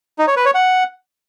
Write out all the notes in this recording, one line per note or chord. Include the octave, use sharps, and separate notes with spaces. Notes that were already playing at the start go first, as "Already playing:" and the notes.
D#4
C#5
B4
C#5
F#5